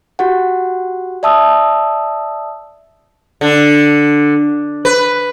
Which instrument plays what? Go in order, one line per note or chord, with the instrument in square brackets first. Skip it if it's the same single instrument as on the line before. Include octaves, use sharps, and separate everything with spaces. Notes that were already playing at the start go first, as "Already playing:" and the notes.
[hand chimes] F#4 G4 F#5
D5 E5 A5 D#6 E6
[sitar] D3
B4